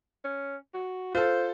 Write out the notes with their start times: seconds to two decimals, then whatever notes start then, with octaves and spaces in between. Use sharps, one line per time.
0.24 C#4
0.74 F#4
1.15 F4 A4 C5